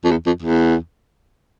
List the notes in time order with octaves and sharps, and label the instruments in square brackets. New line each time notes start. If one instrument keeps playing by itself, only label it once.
[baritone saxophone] F2
E2
F2
E2